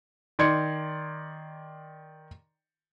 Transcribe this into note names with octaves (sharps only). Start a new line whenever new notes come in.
D#3 D5 C6 G#6 C#7